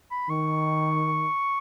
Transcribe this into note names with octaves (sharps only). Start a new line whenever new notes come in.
B5
D#3 C#6